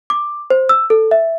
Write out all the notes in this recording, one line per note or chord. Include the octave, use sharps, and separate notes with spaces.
D6
C5
E6
A4
E5